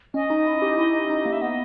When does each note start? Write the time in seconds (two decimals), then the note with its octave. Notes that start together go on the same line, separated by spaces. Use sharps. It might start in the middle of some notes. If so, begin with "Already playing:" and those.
0.14 C#4 D#5
0.30 D#4
0.46 E4
0.62 G4
0.78 E4
0.94 D#4
1.10 D#4
1.25 A#3
1.33 E5
1.41 B3 D#5